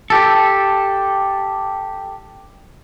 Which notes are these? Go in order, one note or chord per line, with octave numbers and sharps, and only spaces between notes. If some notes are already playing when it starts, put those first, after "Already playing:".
G4 A4